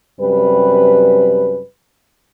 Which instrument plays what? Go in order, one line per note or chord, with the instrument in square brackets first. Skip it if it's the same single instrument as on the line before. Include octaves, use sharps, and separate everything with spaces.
[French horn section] F#2 C3 G3 B4